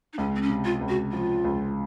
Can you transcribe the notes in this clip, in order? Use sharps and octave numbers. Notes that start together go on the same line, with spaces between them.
D#4
C#2 C#4
C4
C#4
C3
F4
C#2
F#4
F3 F4
C#2